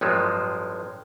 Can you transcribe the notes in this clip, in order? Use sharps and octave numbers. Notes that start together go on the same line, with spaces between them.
A1 G2 F3 F#3 G#3